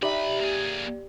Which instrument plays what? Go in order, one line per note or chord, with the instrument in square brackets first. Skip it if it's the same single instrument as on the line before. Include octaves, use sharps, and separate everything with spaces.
[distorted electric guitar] B1 B5 [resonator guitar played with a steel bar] D#4 E5 [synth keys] G4 D5
[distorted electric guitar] A#3 G#4